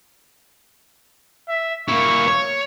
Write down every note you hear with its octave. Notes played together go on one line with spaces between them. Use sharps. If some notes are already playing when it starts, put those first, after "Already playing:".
E5
A#3 E4 C#6
C#5